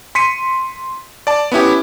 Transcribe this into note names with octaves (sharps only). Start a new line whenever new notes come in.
C6 B6 C#7 D#7
D5 A5
B3 C#4 E4 G4